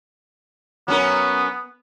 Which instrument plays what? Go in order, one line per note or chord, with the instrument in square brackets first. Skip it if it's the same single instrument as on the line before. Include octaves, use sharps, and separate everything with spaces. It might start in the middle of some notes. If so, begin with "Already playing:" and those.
[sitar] F#3 C#4 A#4 [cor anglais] B3